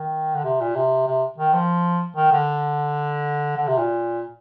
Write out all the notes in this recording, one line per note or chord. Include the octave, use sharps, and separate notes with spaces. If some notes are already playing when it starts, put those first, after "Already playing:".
Already playing: D#3
D3
C3
A#2
C3
C3
D#3
F3
D#3
D3
D3
C3
A#2